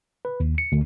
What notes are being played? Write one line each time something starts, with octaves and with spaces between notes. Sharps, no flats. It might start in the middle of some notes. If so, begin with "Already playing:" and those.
B4
D#2
C#7
D2